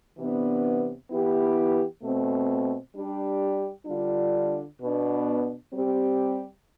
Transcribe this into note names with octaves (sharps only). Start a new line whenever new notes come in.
C3 E3 B3 D4
E3 B3 E4 G4
B2 A3 C4
G3 D4 G4
D3 G3 D4 F4
B2 B3 D4
G3 C4 G4